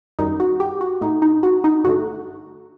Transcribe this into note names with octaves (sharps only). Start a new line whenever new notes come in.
F#2 D#3 G3 D#4
F#4
G4
F#4
A2 A3 D#4
D#4
F#4
D#4
G2 D3 A3 F#4